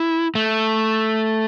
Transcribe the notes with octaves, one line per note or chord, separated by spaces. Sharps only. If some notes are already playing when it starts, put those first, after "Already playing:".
Already playing: E4
A3